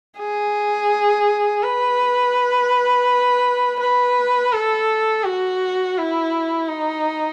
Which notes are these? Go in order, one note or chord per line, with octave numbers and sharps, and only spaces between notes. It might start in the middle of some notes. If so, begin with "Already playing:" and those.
G#4
B4
B4
A4
F#4
E4
D#4